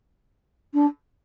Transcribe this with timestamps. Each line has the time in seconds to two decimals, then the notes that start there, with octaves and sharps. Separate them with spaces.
0.74 D4